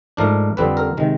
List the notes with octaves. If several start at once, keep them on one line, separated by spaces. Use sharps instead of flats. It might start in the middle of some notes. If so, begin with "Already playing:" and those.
G#2 F3 A3 D4 A#4
F2 D3 G3 C4 B4
A#4
C3 D#3 G#3